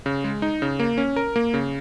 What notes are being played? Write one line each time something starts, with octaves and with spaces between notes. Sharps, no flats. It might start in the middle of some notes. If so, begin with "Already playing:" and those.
C#3
G#3
D#4
C#3
A#3
C#4
A#4
A#3
C#3